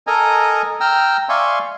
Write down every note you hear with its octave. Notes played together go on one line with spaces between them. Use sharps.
A4 A#4 D#5 G#5 A#5
G5 A#5 E6 F6
D5 E5 F5 G#5 C6 C#6